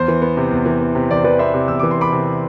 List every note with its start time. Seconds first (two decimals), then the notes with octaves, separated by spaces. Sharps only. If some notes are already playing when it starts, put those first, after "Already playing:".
Already playing: E2 C5
0.08 E3
0.22 B3
0.37 C3
0.51 E2
0.66 E3
0.81 B3
0.95 C3
1.10 E2 D5
1.17 C5
1.24 E3 B4 D5
1.39 B3 C5 E5
1.54 C3
1.68 E2 E6
1.80 E3 D6
1.91 C6
1.98 B3 B5 D6
2.12 C3